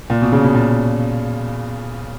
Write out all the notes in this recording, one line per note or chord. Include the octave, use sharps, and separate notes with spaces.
A#2
B2
C#3
B2
A#2